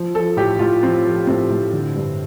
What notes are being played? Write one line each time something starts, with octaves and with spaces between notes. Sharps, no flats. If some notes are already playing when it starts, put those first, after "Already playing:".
Already playing: F3
F3 A4
A2 G4
A2 F4
F3 C4
F3
A2 C4
A2
D3
G2